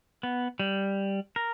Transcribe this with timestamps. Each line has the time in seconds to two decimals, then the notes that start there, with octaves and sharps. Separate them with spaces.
0.23 B3
0.60 G3
1.36 A#4